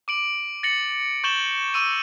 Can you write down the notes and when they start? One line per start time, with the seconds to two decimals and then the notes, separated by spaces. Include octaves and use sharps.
0.08 D6 D7 F#7
0.63 A6 A#6 C#7 F#7
1.24 C#6 G6 A6 E7 F#7 G7
1.74 C#6 E6 D#7